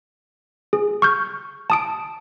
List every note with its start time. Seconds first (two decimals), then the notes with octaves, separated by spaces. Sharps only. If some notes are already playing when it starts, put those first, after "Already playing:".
0.73 G#4
1.02 C#6 F6 G6
1.70 A5 D#6 D7